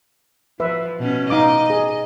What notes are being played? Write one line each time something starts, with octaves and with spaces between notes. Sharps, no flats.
F3 B4 E5
B2 C#4
D#4 D#5 F5 D6
G#4